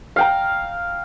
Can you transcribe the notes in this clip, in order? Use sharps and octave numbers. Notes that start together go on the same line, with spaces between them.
F5 G5 A#5